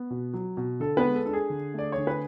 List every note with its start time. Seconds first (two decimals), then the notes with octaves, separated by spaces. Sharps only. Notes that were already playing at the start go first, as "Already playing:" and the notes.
Already playing: B3
0.10 B2
0.33 F#3
0.57 B2
0.80 D3 A4
0.97 B3 B4
1.04 G#3
1.15 A4
1.26 D4 A4
1.33 G#4
1.50 D3
1.74 A3 D5
1.92 C#5
1.97 D3
2.07 B4